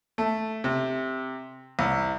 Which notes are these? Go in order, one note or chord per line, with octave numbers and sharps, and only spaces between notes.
A3
C3
C2